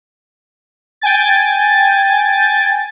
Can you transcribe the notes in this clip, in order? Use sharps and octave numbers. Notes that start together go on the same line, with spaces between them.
G5 G#5 A6